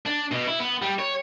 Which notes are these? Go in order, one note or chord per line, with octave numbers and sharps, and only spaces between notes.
D4
B2
E4
B3
G3
C#5